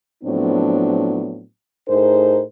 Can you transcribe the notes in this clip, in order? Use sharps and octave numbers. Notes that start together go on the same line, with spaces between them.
A2 F3 F#3 B3 C4 D4
A2 D#4 G#4 A#4 C5